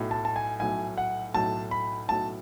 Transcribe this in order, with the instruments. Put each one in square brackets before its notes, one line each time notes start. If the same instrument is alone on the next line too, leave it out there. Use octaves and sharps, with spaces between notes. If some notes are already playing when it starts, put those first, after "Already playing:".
Already playing: [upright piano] B1 A2 F#3
[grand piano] A5
A5
G#5
[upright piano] B1 A2 F#3 [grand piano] G#5
[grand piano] F#5
[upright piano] B1 A2 F#3 [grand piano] A5
[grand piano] B5
[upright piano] B1 A2 F#3 [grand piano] A5